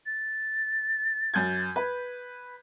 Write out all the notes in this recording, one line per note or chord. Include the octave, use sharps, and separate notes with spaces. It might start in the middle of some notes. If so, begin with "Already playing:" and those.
A6
F#2 G6 G#6
B4